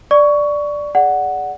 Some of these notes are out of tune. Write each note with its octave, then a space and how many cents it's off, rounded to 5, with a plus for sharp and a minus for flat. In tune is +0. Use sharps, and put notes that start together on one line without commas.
D5 +0 C#6 +15
G#4 +0 D5 -10 F#5 +0